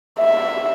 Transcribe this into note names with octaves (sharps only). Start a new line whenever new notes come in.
E5